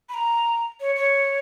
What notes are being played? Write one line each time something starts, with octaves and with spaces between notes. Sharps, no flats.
B5
A#5
C#5
C#5